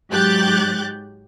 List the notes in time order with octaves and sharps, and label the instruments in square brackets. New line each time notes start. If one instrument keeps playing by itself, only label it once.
[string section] G#2 F#3 G4 F#6 G6 A6